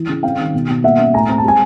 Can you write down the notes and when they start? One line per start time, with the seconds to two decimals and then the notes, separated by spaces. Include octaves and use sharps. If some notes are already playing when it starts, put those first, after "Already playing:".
Already playing: E3
0.09 C#3
0.23 C4 F5 G5
0.38 D#3
0.54 B2
0.69 B2
0.83 A#3 E5 F#5
0.99 C#4
1.14 A2 G#5 A#5
1.29 C4 A#5
1.38 A5
1.44 G#3 G#5